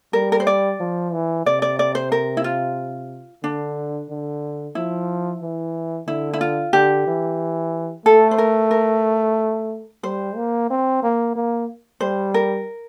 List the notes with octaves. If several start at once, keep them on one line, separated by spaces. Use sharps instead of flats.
G3 A#4
A#4
C5
D5
F3
E3
C3 D5
D5
D5
C5
A#4
E4
F4
D3 D4
D3
F3 E4
E3
D3 E4
E4
F4
D3 G4
E3
A3 A4
C5
A#4
A#4
G3 C5
A#3
C4
A#3
A#3
G3 C5
A#4